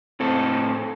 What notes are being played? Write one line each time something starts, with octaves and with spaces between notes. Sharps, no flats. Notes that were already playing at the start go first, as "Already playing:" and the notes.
A2 C4 A4